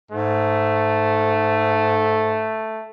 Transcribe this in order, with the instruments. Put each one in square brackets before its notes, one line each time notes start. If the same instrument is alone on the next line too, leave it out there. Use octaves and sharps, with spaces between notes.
[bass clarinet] G#2 [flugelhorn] A3